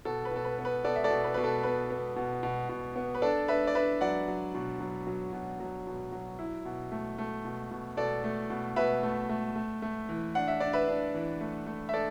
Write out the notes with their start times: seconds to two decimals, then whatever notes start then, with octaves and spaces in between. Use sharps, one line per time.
0.05 B2 A4
0.25 B4
0.31 B2 A4
0.45 B4
0.58 B3
0.65 B4
0.84 B3 A4 D5
0.96 E5
1.04 A4 D5
1.10 B2
1.24 B4
1.34 B2 B4
1.44 A4
1.63 B3 B4
1.91 B3
2.16 B2
2.43 B2
2.69 B2
2.96 B3
3.15 B4
3.22 D4 A4 D5
3.48 D4 B4 E5
3.67 D5
3.75 D4 B4 E5
4.01 F#3 D5 F#5
4.28 F#3
4.55 B2
4.80 F#3
5.07 F#3
5.33 B2
5.60 F#3
5.87 B2
6.12 F#3
6.39 E4
6.65 B2
6.92 A3
7.18 A3
7.45 B2
7.71 B2
7.97 B2 A4 D5
8.24 A3
8.50 B2
8.76 B2 B4 E5
9.03 A3
9.29 A3
9.56 A3
9.82 A3
10.09 E3
10.35 D4 F#5
10.48 E5
10.60 D4 D5
10.73 B4 E5
10.88 D4
11.15 E3
11.41 A3
11.66 A3
11.89 E5
11.94 D4 A4 D5